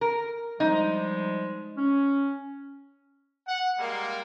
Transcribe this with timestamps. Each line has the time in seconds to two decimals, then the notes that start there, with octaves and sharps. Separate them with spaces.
0.01 A#4
0.60 F3 G3 G#3 D#4
1.77 C#4
3.47 F#5
3.77 G3 G#3 A#3